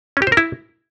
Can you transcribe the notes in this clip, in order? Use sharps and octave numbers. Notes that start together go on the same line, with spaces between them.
C#4
G4
C5
A#4
E4